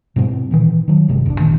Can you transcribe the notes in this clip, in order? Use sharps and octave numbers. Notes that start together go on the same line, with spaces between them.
G#2 B2 G3 C4
A#2 D#3 E3
D#3 F#3
G1 C3 G#3
F1 C2 B2 D4
A1 A#2 D#3